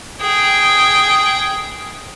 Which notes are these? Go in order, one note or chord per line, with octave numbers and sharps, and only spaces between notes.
G#4 G5